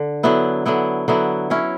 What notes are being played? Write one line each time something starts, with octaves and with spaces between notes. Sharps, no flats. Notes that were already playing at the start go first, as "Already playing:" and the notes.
Already playing: D3
D3 F#3 B3 E4
D3 F#3 B3 E4
D3 F#3 B3 E4
F#3 C#4 E4